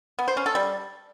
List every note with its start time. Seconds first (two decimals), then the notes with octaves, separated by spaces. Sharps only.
0.19 B3
0.28 C5
0.37 C#4
0.46 A4
0.55 G3